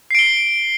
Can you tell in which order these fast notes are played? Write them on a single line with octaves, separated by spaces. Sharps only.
C7 D7 G7